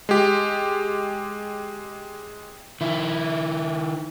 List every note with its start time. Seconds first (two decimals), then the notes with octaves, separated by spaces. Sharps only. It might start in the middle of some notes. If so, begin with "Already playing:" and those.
0.09 G#3 G4
2.81 D#3 E4